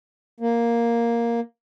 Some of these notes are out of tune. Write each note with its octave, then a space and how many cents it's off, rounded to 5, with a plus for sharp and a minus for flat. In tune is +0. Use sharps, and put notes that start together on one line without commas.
A#3 +5